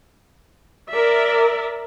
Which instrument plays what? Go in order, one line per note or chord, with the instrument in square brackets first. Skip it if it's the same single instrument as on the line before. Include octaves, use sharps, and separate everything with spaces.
[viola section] A#4 D5 E5